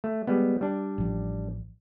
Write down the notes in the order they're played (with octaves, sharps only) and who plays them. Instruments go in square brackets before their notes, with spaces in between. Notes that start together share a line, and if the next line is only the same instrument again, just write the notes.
[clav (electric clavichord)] A3
G3 G#3 B3
G3 D4
[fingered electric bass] A1 F3